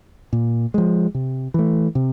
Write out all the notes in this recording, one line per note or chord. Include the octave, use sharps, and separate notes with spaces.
A#2
F3 G#3
C3
E3 A3
C3